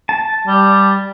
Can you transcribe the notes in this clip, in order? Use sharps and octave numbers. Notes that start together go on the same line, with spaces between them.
A5
G3